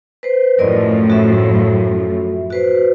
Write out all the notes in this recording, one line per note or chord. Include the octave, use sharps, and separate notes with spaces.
B4 C5
F#2 A2 F3 A#4 D5 D#5
F#4 A4 E5
F#4 B4 C5